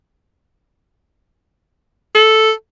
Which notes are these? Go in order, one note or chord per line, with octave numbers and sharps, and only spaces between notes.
A4